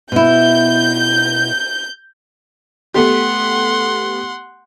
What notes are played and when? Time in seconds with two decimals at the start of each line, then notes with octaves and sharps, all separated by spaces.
0.12 B2 E4 G6
2.95 A3 B3 G4 F#5 C6